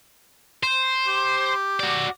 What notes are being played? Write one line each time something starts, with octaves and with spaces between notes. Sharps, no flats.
C5
G4
F#4 D5